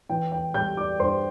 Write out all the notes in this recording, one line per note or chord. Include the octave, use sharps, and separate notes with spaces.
E3 G5
G5
G3 G5 G6
D5 D6
G2 C5 C6